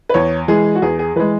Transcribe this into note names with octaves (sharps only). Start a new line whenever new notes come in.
B4
E2 C#5
E3 G#3 G#4
F#4
E2 G#4
G#4
E3 G#3 B4